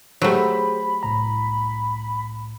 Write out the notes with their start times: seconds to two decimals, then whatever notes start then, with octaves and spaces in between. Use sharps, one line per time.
0.22 F#3 A3 G4 G#4 C5 B5
1.03 C2 A2 A#5